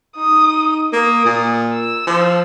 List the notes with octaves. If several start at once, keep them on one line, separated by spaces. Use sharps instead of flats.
D#4 D#6
A#3 D#6
A#2
E6
F3